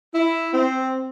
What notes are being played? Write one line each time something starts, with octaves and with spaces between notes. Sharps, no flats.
E4
C4